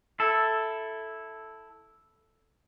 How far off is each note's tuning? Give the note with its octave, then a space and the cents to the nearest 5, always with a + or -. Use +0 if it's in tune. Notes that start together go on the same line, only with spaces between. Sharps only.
E4 +0 A4 +0